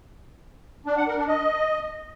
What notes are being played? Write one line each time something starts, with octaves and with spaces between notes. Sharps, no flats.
D4
F#5
A#4
D4
D#5